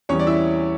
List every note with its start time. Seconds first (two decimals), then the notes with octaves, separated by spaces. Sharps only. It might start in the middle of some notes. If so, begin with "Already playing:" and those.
0.09 E2 E3 G3 C#4 C#5
0.19 D5
0.27 E4 E5